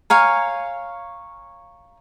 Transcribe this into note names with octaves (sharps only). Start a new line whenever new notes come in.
C#5 F5 G#5 A#5